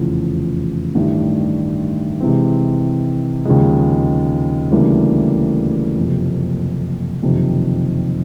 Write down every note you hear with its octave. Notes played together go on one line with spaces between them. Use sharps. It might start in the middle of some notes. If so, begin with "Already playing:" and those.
Already playing: F1 E2 C#3 F3
A1 G2 D#3 G3
C3 E3 G#3 C4
D#2 C#3 F3 G#3
D2 C#3 E3 G3 A#3
F#1 F2 C3
F#1 F2 C3 D#3